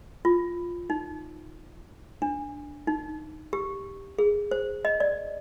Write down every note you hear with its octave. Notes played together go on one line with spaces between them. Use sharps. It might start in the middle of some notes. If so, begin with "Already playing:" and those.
F4
D#4
D4
D#4
G4
G#4
C5
D#5
D5